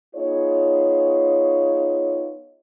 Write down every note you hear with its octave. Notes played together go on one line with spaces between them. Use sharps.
B3 D#4 F4 G#4 C#5